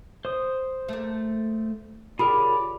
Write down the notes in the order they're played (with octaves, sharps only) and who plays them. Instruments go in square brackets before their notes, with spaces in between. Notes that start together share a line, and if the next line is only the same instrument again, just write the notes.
[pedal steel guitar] C5 D#6
[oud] A3 A#3
[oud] C#3 C#4 G4 [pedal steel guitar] F4 G#4 A#4 [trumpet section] D5 [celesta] B5